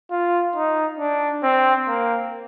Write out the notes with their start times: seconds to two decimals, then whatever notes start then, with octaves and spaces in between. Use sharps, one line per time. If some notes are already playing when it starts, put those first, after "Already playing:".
0.11 F4
0.56 D#4
0.99 D4
1.44 C4
1.88 A#3